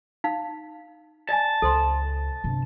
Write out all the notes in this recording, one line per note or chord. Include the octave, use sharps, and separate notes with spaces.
D#4 F5
D5 D#5 G#5 A5
C#2 A4 C5 C6
G1 C3